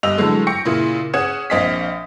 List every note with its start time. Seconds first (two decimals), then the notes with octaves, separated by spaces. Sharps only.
0.03 G1 G3 D#5 E6 F7
0.17 D3 E3 F#3 G#3 A3
0.47 G5 C#6 A#6 C#7
0.65 A#2 C#3 E4
1.14 C#4 G#4 F#5 D#6 G#6 E7
1.50 A#1 C4 D#5 F5 D#6 B6